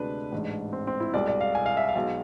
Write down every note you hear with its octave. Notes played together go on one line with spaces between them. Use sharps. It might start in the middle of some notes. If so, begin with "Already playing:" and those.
Already playing: D2 C3 G#3 D4 B4
A1 G#2 G#3
C4
C4
E4
C2 B2 G#3 D5
D5
F5
G#5
F5
E5
F5
B1 B2 G#3